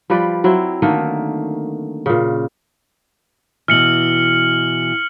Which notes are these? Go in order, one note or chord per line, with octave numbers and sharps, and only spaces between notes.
F3 G3 B4 D5
F#3 C4 E4
D3 D#3 A3 A#3
A#2 C#3
B2 E3 F6 C#7 F#7